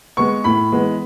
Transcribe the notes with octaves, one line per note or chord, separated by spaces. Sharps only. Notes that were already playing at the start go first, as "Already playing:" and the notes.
G#3 B3 C#6
A2 B5
E3 G#3 B3